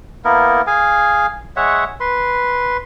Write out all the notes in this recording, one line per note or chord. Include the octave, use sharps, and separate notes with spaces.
A#3 B3 E4 A#4
G#4 F5 G#5
G#3 C#5 E5 F#5
B4 C6